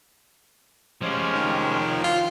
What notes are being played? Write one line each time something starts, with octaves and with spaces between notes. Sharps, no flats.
F3 G#3 C#4 G4 G#5
D#3
F4